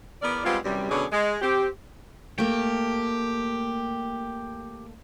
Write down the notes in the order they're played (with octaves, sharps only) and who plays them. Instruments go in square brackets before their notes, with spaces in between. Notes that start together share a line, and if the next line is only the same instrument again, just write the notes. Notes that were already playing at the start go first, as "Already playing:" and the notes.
[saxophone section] E2 B3 A#4 D5
G3 G#3 B3 C4 F4
F#2 C3 E3 G3
B2 D3 F#3 C#4 G#4 D5
G#3
C4 G4
[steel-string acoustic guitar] A3 A#3 [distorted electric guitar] G4